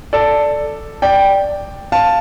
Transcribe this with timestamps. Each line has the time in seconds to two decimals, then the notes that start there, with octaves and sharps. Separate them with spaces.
0.13 A4 D5
1.02 D5 G5
1.92 F5 A5